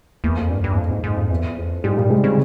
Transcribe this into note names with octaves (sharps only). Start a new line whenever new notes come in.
E2 A#3
F2
G2
G2
E2
F2
G#2
G#2
F2
E2
F2
G#2 G3
A#2 G3
C3 G#3
C#3 C4